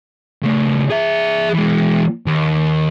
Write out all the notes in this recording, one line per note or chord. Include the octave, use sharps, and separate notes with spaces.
C#3 A3
G#4 E5
E3 G#3
D#2